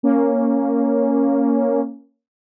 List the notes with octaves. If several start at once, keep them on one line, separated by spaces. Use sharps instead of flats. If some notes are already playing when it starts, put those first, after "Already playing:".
A#3 C#4